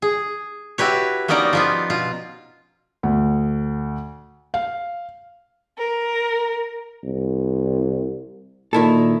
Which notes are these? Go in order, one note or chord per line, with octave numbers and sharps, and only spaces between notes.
G#4
E4 F#4 G4 B4 C#5
A#3 B3 C#4 D#4 D5 A#5
F3 B3 F4
B2 F4
D2
F5
A#4
C2
A#2 D#3 E4 A4